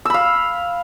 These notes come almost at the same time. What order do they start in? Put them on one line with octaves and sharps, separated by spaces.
E6 B5 F5